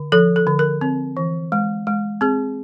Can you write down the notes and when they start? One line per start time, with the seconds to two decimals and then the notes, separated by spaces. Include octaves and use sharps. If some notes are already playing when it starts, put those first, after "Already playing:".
Already playing: D3
0.12 F3 A4
0.36 A4
0.47 D3
0.59 A#4
0.81 C4
1.17 E3
1.52 G#3
1.87 G#3
2.21 C4 G#4